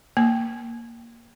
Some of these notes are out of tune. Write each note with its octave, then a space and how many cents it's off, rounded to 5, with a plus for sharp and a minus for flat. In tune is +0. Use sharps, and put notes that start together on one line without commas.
A#3 +0 G#5 +30